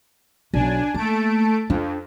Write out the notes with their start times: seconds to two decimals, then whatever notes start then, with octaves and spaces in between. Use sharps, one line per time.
0.54 B1 D4 G#5
0.94 A3 A#3 A5 D7
1.70 F2 D4